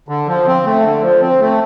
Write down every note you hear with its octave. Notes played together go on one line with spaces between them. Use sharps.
D3
F3
C4
A3
D3
F3
C4
A3